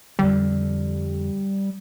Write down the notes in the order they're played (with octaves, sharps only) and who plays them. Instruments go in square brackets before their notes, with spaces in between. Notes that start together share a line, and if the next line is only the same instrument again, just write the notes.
[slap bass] F2 D3 [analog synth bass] G3